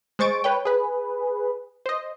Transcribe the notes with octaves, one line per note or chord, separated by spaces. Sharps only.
G#3 C5 C#6 A6 D7
B4 C#5 G5
G#4 B4
C5 D#5